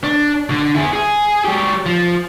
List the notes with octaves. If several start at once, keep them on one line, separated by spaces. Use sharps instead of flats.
D4
D3
E4 G#4
G#4
F#3 G4
F3